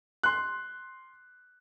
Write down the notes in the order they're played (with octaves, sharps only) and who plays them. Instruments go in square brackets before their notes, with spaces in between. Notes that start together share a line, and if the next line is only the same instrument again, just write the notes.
[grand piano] C6 F#6